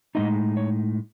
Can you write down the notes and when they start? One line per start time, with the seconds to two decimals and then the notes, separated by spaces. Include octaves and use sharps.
0.15 A2 G#3 C4 D#4 D#5
0.57 C#5